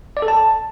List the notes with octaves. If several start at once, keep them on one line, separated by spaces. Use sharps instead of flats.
D5
A4
A5